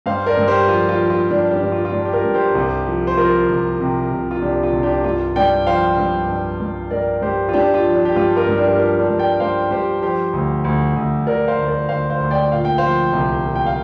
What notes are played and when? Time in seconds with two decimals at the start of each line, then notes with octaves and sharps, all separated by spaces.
0.06 G2 C5 F5
0.26 A#4 D5
0.37 G2
0.48 G4 C5
0.68 F3 F4
0.89 F4
1.00 F3
1.10 F4
1.31 G2 D4
1.51 D4 G4
1.62 G2
1.72 F4
1.85 F4
1.93 G2 D4
2.05 G4
2.13 F4 A#4
2.24 G2
2.34 G4 C5
2.55 C2
2.86 F3
3.07 C5
3.17 F3 F4 A#4
3.49 C2
3.80 C3
4.11 C2
4.31 F4
4.42 C2 D4 G4
4.63 F4
4.73 C2
4.83 D4 G4
5.04 G2 F4
5.36 G2 D5 G5
5.66 F3 C5 F5
5.98 G2
6.28 G2
6.60 G2
6.91 G2 A#4 D5
7.22 G2 G4 C5
7.49 F4
7.53 G2 D4 G4
7.74 F4
7.84 F3
7.95 D4
8.05 G4
8.16 G2 F4
8.37 F4 A#4
8.47 G2
8.57 D4 G4
8.68 A#4
8.78 F3 D4 G4
8.99 D4 G4
9.09 G2
9.19 D5 G5
9.40 G2 C5 F5
9.71 G2 G4 C5
10.02 F3 G4 C5
10.33 D2
10.64 D2
10.96 D2
11.27 D2 A#4 D5
11.48 C5 F5
11.58 D2
11.68 A#4 D5
11.89 D2 C5 F5
12.10 C5 F5
12.20 D2
12.31 D5 G5
12.52 A#2 F5
12.65 G5
12.78 F3 C5 F5
13.13 C2
13.45 A#2
13.56 G5
13.66 F5